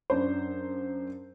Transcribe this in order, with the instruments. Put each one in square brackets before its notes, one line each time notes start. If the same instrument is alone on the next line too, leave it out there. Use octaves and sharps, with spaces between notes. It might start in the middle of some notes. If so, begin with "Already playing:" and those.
[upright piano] F#2 D4 C5